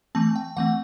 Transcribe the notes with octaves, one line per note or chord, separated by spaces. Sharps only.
E3 A3 C4 A5
G5
E3 A3 C4 F#5